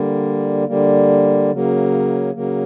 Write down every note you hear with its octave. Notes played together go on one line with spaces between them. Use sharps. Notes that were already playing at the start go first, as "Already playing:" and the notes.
Already playing: D3 G3 A#3
D3 G3 A#3
C#3 F#3 A#3
C#3 F#3 A#3